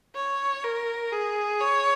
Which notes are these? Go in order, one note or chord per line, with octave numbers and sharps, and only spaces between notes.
C#5
A#4
G#4
C#5